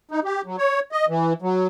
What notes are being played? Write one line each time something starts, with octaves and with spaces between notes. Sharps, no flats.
D#4
G4
F#3
C#5
D#5
E3
F#3